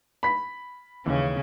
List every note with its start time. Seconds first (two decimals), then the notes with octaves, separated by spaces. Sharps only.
0.23 B5 B6
1.06 D#2 C#3 E3 C#4